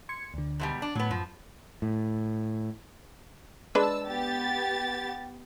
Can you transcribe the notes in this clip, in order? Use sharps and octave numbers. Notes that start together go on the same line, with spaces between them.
C6 G#6 C#7
D2 D3
G#2 B2 G3
D4
A2 F#3 B3
F#2 F3
A2
G#3 D4 B4 A5 E6
B3 G4 A6